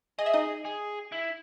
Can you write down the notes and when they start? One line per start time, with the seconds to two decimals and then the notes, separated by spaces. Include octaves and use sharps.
0.19 G#4 D#5
0.26 E5
0.33 D#4 D#5
0.65 G#4
1.12 E4